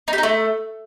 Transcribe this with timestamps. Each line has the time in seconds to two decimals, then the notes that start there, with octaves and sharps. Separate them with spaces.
0.08 D#4
0.13 G4
0.18 D#4
0.23 A3